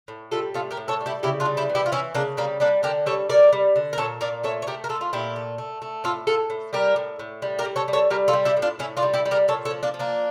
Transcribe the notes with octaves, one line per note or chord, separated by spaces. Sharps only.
A2
G3 F4 A4
A2 F4 A4
G4 A#4
A2
A4 C#5
G3
E4 G4
C#3 E4 G4
D4 F4
G3
E4 G4
E3
E4 G4
F4
E3 C#4 E4
C#3 A#3 D4
G3 A#3
G3 A#3 D4
D3 G4 A#4
G3 A4 C#5
G3 A#4 D5
G3
D3
A#4
A#2 A4 C#5
A#2 A#4 D5
A3 A4 C#5
C#5
A3 G4 A#4
A#4
A3 F4 A4
F4
A#2 E4 G4
A3
A3
A3
A2 F4 A4
A2 F4 A4
A2
G3 G4 A#4
A2
A2
G3
G4 A#4
G3
A4 C#5
G3
A4 C#5
G3 G4 A#4
F4 A4
G3
E4 G4
A2
D4 F4
A2 C#4 E4
D4 F4
G3
E4 G4
G3
G4 A#4
A#2 A4 C#5
A4 C#5
F3
A#3 D4
F3
A#3 D4